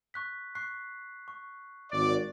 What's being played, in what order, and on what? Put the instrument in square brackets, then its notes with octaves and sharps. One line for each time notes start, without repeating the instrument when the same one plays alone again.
[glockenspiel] C#6 F#6 B6
C#6 F#6 C7
C#6
[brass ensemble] G#1 D5